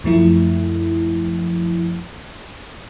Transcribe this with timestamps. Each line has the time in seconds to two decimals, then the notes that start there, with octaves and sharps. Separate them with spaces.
0.04 F#2 F3 A3 E4